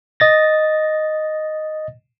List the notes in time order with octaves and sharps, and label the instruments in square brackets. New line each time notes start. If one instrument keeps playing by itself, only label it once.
[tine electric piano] D#5 A6 A#6